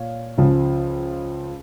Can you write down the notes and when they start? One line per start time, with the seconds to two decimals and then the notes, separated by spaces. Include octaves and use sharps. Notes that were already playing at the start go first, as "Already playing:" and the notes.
Already playing: A#2 C#5 F5
0.38 C#2 C#3 F3